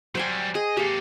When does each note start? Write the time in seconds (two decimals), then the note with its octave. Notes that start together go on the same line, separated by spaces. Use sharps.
0.15 F#3 G3 C5 G5 G#5
0.55 G#4 D#5
0.77 A#3 G4 A4 F5